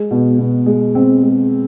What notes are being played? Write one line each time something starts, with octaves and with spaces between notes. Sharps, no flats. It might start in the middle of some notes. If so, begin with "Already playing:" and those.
Already playing: G#3
B2
B2
G#3
C4
G#3